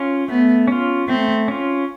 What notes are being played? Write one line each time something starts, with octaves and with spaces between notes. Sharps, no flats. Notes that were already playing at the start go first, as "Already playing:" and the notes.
Already playing: C#4 F4
A3 B3
C#4 F4
A3 C4
C#4 F4